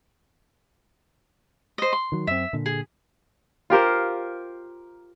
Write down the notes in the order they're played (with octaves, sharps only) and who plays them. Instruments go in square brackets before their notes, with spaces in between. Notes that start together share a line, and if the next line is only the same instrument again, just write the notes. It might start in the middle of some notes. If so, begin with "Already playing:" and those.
[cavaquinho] C5 D#5
C6
[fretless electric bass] D#3 F#3
[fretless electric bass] F#2 C4 [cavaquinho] E5
[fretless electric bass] A#2 D3
[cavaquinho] G#4
[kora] F4 G4 A#4 C5